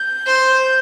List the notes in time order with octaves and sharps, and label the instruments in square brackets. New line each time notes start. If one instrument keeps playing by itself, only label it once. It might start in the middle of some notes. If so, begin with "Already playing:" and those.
Already playing: [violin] G6
[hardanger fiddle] C5